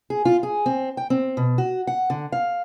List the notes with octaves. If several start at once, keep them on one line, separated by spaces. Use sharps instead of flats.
G#4
F4
G#4
C4
G5
C4
B2
F#4
F#5
D3
F5